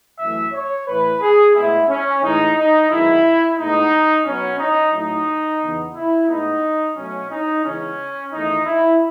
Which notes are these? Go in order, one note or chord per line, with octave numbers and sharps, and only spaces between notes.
F#2 E3 A3 E5
C#5
A2 E3 A3 B4
G#4
A2 G#3 B3 E4
C#4
A2 E3 G#3 D#4
D#4
F#2 D#3 G#3 B3 E4
A2 G#3 B3 D#4
B2 F#3 B3 C#4
D#4
A2 F#3 A3 D#4
E2 C#3 E3 B3
E4
A2 G#3 B3 D#4
B2 F#3 A3 C#4
D#4
C#3 E3 G#3 B3 C#4
E2 D#3 A3 D#4
E4